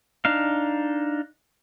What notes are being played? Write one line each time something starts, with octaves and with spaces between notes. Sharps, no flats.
D4 D#4 F5